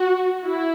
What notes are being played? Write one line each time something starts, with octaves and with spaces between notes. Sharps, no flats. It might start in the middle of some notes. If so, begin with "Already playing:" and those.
Already playing: F#4
E4